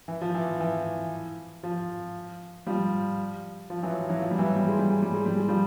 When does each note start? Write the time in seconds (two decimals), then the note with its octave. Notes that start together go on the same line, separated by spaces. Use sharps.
0.08 E3
0.21 F3
0.34 E3
0.60 E3
1.63 F3
2.67 F3 G3
3.70 F3
3.83 E3 F#3
4.09 E3 F#3
4.22 F3
4.31 G3
4.38 E3 F#3
4.56 G3
4.68 G#3
4.79 G3
4.91 G#3
5.02 G3
5.14 G#3
5.26 G3
5.37 G#3
5.49 F3 G3